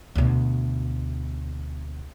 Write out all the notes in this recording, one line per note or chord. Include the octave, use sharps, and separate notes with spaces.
D2 B2